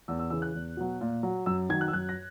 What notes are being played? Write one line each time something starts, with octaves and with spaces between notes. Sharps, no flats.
E2 E6
E6
C#3 E3 E6
F#6
E2
B2 F#3
A#2
F#3
F#2 E6
D#3 F#3 G#6
F#6
E6
F#2 F#6
A#6